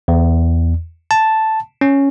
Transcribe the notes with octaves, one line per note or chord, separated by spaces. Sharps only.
E2
A5
C#4